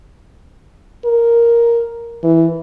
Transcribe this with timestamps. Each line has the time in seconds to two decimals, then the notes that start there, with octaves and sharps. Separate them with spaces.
1.05 A#4
2.24 E3